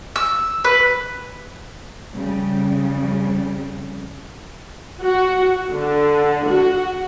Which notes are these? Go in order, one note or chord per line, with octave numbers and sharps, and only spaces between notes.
E6
B4
F2 C#3 G3
F#4
D3
F#4